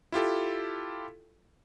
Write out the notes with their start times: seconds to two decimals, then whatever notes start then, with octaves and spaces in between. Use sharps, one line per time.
0.12 E4 F4 G4 A4